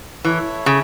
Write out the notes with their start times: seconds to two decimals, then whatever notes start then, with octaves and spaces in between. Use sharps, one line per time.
0.24 E3 E4 A4 C#5 E5
0.66 C#3